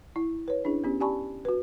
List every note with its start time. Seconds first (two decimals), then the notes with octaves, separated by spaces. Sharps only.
0.16 E4
0.48 B4 C#5
0.64 C#4 D4 E4 G#4
0.84 B3 C#4 G4
1.01 G4 D5 G#5 A5 B5 C#6
1.45 F#4 B4